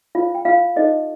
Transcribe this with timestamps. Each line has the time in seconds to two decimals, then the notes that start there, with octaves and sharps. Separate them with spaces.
0.15 F4 C5 F5
0.35 G5
0.45 F4 F5
0.76 D#4 A4 C5 D#5